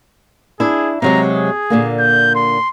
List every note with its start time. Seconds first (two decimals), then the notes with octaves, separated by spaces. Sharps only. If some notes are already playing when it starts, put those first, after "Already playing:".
0.60 D4 E4 G#4
1.02 C3 F#3 G#3 A#5
1.33 G#4
1.70 A#2 D3 A#3
2.00 G6
2.36 C6